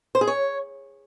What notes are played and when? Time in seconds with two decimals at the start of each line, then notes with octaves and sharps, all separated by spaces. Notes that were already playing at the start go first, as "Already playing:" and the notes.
0.15 C5
0.21 G#4
0.27 C#5